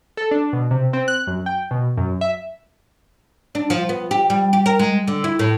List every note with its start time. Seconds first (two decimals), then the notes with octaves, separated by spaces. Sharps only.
0.17 A4
0.31 D4
0.53 B2
0.71 C3
0.93 C4
1.08 F#6
1.27 F#2
1.46 G5
1.71 B2
1.97 F#2
2.21 E5
3.55 D4
3.70 F3
3.89 B3
4.11 G4
4.30 G3
4.53 G4
4.66 A#4
4.79 G#3
5.07 D3
5.24 E4
5.39 A2